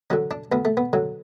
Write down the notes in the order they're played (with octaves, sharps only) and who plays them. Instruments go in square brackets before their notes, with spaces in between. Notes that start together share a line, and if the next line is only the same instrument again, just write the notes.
[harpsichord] D3 F#3 C#4
D4
D2 B3
A3
B3
D3 F#3